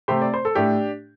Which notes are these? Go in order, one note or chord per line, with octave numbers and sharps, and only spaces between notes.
C3 A3 G4 C5
D5
C5
A4
A2 A3 D4 G4